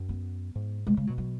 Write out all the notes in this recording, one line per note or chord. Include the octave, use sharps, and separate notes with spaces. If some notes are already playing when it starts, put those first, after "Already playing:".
Already playing: F#2
B3
G#2
B2 G#3
C#3 G#3
B2 F#3
F#3